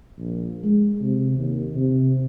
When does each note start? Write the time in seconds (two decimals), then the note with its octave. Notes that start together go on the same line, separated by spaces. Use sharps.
0.18 A#1
0.64 G#3
1.01 C3
1.38 D#2
1.75 C3